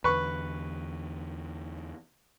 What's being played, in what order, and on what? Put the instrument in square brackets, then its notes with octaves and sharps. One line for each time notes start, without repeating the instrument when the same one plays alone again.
[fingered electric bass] E2 D3 [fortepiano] B4 C#6